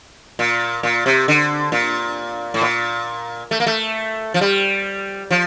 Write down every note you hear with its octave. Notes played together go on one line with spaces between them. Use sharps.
A#2
A#2
C3
D3
A#2
A2
A#2
A3
A#3
A3
F3
G3
F3